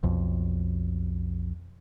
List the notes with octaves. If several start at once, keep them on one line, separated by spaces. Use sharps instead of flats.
B1 F2